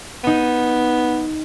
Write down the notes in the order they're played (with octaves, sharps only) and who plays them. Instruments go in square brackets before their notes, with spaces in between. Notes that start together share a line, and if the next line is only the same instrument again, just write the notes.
[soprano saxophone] B3 [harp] D#4 D#7